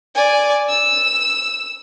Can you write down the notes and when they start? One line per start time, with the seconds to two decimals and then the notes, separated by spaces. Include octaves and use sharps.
0.15 D5 G#5
0.69 E6